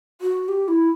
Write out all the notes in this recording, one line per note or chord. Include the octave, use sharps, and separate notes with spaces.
F#4
G4
E4